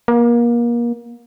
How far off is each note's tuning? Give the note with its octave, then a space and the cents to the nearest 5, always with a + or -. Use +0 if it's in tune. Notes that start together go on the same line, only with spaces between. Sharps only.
A#3 +30